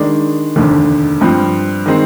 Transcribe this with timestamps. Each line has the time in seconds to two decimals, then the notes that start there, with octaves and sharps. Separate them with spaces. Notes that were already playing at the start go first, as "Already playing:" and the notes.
Already playing: D#3 G#3 D4
0.56 F1 D#2 D3
1.20 G2 F3 C4
1.86 D#3 G#3 C4